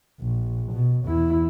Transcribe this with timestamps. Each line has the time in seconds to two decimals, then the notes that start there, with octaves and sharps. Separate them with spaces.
0.20 A#1
0.72 B2
1.05 E2 E4